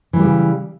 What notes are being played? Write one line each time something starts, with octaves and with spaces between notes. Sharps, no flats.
C#3 E3 G3 A3